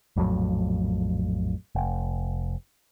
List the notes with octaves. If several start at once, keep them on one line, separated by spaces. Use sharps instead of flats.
A#1 F2 A2 F#3
F1